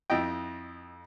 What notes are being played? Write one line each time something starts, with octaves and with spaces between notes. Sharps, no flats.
F2 E4 D#5 G5